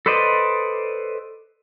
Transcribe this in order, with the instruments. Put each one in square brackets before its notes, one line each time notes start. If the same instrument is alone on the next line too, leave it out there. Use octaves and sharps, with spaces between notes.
[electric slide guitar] A4 B4 C5 D5 D#5